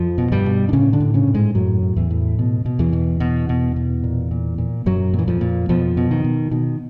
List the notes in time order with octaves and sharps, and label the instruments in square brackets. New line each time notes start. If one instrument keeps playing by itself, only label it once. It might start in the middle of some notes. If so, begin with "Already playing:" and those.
Already playing: [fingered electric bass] F2 F3
B2
G2 G3
B2
D4
A2 C#3 C#4
D3 D4
A2
C#3 C#4
A2
G#2 G#3
F#2 A2 F#3
A2
E2 E3
A2
B2
B2
E2 E3
B2
B2
B2
B2
A#2
A#2
A#2
F#2 A#2 F#3
A#2
E3
F2 F3
A#2
F2 B2 F3
B2
D#3
B2
B2 D#3